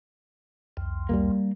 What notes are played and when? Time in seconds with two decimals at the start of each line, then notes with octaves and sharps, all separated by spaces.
0.77 C2 F2
1.09 G3 G#3 A#3